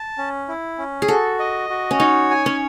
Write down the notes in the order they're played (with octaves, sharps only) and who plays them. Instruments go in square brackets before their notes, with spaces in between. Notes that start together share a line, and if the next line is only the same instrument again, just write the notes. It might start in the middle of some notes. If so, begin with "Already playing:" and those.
Already playing: [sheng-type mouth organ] A5
C#4
E4
C#4
[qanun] G#4
[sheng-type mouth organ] F#4 [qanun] A4
[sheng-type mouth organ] D#5
F#4
[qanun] C#4
[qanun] D#4 [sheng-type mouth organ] C#5
[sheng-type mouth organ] G#5
[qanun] C#4